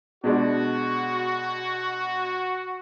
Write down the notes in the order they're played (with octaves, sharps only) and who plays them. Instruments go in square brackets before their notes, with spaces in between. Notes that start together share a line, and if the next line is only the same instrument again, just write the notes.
[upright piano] B2 G#3 D4 [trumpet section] F#4